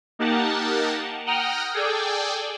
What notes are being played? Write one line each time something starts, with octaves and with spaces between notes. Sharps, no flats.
A#3 D#4 G4 A#4 F#5 A5
F#5 G5 A#5 D#6 F6
G#4 A4 D5 G5 G#5